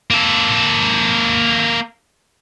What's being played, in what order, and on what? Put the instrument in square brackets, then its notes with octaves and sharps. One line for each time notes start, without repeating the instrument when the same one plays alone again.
[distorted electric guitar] A#3 A4